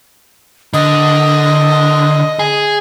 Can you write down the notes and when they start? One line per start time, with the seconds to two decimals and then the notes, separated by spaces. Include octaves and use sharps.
0.74 D3 D#5
2.39 G#4